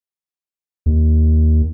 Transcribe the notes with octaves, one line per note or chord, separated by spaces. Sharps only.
D#2